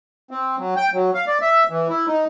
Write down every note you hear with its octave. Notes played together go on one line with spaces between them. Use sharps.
C4
F#3
G5
F#3
F5
D5
E5
E3
E4
D#4